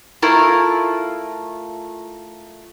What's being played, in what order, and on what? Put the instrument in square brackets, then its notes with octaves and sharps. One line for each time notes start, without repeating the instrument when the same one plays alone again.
[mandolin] A3 E4 F4 A#4